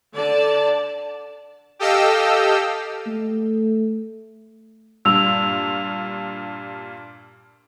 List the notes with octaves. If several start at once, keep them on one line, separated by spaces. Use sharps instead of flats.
D3 D5 A5
G4 A4 D#5 F5 G5 E6
A3
G2 A#2 E6 F7